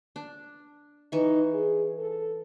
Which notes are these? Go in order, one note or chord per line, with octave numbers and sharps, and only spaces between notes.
D4
E3 D#4 C#6
G#4
A4